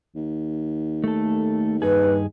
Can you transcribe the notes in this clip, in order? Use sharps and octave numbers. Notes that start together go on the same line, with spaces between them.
D#2
A3 A4
G2 D#4 G#4 B4